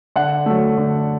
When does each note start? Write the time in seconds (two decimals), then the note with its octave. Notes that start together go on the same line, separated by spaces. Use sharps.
0.16 D3 F#5
0.46 F#3 A3
0.77 D3